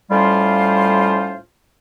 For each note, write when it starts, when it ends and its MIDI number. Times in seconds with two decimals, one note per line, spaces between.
0.11 1.37 45
0.11 1.37 55
0.11 1.37 61
0.11 1.37 65
0.11 1.37 72
0.11 1.37 77